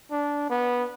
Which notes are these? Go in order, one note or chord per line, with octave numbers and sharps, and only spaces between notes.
D4
B3